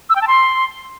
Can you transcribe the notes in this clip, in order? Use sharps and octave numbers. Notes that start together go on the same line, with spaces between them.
E6
G5
A5
C6